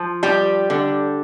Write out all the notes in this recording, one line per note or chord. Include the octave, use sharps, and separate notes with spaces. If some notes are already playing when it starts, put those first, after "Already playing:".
Already playing: F3
G3 G4
D3